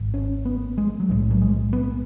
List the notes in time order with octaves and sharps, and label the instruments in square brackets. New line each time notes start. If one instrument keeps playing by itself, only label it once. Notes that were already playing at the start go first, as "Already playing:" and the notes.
Already playing: [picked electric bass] G#1 G#2
C#4
B3
G#3
F#3
B1 A2 G#3
F#3
G#3
B3